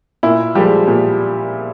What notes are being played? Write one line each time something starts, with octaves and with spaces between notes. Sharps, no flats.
A#2 E4
F3 G3 G#3 G4
A#2